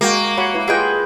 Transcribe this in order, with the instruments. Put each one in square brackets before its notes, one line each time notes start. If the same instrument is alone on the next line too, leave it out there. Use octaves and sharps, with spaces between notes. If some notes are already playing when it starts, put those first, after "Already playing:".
[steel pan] G#3 F#4 G5 [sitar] A#3
[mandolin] F#4 [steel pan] C#5 F#5 B5
[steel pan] E4 B4
[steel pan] F4 D#5 F#5 [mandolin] G#4 B4 G5